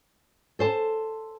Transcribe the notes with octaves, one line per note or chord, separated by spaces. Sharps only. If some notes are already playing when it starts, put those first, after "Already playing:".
A4 C5 A5